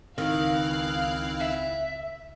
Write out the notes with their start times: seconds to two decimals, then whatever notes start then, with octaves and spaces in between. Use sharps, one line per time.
0.18 C#2 D#3 C4 E4 F5 F#6
1.41 E5